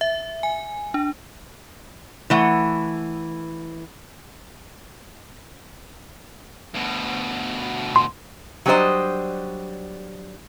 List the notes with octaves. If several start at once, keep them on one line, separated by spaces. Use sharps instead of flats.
E5
G#5
D4
E3 A3 F#5
D2 B2
C6
F#3 G3 D4 A4 C5 D#5